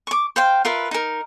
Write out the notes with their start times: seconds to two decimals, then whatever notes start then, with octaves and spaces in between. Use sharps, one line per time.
0.07 C#6 D6
0.36 C5 F5 G5
0.65 F4 A#4 B4 E5
0.91 D#4 A#4